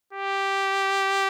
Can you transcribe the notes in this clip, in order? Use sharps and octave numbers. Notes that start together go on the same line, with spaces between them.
G4